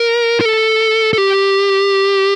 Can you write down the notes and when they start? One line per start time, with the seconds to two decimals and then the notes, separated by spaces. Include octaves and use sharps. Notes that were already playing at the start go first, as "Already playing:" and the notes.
Already playing: A#4
0.41 A#4
0.45 A4
1.13 A4
1.18 G4